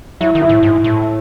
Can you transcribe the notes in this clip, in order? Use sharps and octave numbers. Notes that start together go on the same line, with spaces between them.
F#3 E4
D#3
E4
A2
G#2
A2